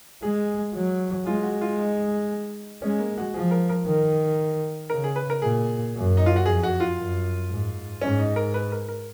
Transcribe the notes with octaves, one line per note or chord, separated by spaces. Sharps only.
G#3 G#4
F#3
G#3 F4
F#4
F4
D#4
G#3 C#4
A#3
F#4
F3 G#4
A#4
A#4
D#3
C#3 A#4
G#4
B4
A#4
A#2 G#4
F#2
D#4
F4
F#4
F2 G#4
F#4
F4
F#2
G#2
G#2 C#4
D#4
A#4
B4
A#4
A#4